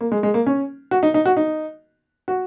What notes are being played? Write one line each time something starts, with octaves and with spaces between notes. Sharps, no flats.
A#3
G#3
G#3
A#3
C#4
F#4
D#4
D#4
F#4
D#4
F#4